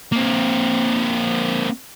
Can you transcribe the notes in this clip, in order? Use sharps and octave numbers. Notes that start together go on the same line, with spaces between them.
A#3 C4